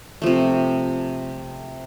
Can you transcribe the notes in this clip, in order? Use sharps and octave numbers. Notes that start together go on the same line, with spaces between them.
C3 F3 A3